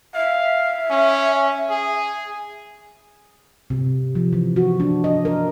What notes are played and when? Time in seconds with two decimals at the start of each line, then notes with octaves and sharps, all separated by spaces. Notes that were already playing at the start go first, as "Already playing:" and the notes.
0.15 E5 F5
0.91 C#4
1.71 G#4
3.70 C3
4.15 F3
4.33 E3
4.56 F#4
4.80 D4
5.04 D#5
5.25 A#4